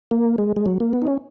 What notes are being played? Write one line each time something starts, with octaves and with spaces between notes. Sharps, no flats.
A#3
G#3
G#3
F#3
A#3
B3
D#4
C#4